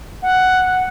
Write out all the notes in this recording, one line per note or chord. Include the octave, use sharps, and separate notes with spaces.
F#5